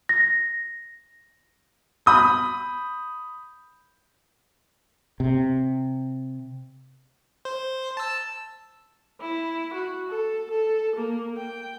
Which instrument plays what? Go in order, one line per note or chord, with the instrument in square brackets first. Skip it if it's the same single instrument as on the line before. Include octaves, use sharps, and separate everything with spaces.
[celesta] A#6
[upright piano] B5 D#6 G6
[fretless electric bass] C3
[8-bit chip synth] C5
A5 E6
[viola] E4
F#4
A4
A4
A#3
G5